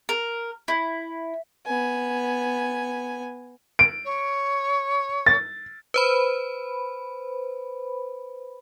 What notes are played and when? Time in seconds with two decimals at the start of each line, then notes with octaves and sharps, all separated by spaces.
0.09 A#4
0.68 E4
1.67 B3 G#5
3.79 D7
4.05 C#5
5.26 A6
5.94 B4 C5 B5